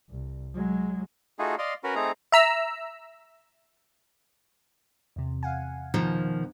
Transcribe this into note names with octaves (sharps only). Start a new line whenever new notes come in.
C2
F#3 G#3
A3 D#4 F4 F#4 G#4
D5 D#5 F5 C6
C#4 F#4 A#4 B4
A3 C4 D#4 G#4 A#5
E5 A#5 E6
E2 C3
F5 F#5 G#5
B2 D#3 F3